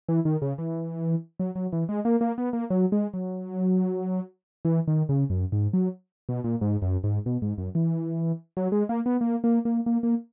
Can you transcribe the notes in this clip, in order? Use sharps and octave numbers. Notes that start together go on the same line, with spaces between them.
E3
D#3
C#3
E3
F#3
F#3
E3
G#3
A#3
A#3
B3
A#3
F#3
G#3
F#3
E3
D#3
C#3
F#2
G#2
F#3
B2
A#2
G#2
F#2
G#2
B2
G#2
F#2
E3
F#3
G#3
A#3
B3
A#3
A#3
A#3
A#3
A#3